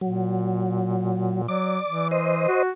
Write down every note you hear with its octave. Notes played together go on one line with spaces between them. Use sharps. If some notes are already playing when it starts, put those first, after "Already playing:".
A#2 F#3
F#3 D5 D6
E3
C5 D#5
F#4